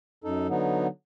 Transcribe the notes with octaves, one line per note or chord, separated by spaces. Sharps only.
F#2 D#4 A4
D3 F#3 B3 D#4